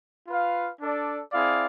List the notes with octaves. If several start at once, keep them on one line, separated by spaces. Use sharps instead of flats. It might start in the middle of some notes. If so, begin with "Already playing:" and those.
F4 B4 F5
D4 A4 D5
C4 E4 G#4 D5 F5